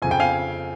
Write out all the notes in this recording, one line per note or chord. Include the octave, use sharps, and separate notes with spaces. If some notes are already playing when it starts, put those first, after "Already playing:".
F2 C#3 F3 G#5
G5
F5 G#5